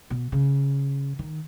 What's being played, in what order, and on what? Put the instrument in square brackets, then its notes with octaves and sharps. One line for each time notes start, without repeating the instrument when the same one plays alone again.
[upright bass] B2
C#3
D#3